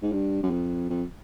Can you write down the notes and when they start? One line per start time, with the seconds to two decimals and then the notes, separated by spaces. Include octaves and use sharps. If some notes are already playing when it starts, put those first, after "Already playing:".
0.02 G#2
0.12 G2
0.43 F#2
0.51 F2
0.90 F2